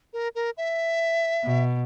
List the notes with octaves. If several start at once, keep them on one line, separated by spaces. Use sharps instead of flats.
A#4
A#4
E5
B2